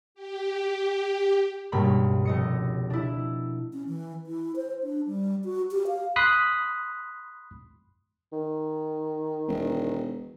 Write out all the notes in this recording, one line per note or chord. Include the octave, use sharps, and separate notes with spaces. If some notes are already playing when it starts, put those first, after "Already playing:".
G4
C#2 G2 B2 A#3 B5
F1 D#5 C#7
D4 E4
C#4
E3
E4
C5
D4
G3
F#4
G4
F5
B5 C6 D#6 F#6 B6 C7
D#3
E1